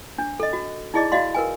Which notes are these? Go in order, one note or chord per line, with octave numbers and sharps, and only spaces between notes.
D4
A4 D#5
F#4
D#4 E4 G#4 D5 D#5 D6
F#4 D5 D#5 F5 C6
A#4 B4 G#5